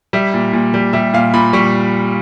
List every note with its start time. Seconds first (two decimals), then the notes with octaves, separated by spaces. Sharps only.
0.13 G3 E5
0.34 A#2
0.53 A#2
0.74 G3
0.93 G3 E5
1.14 A#2 F5
1.34 A#2 B5
1.53 G3 C#6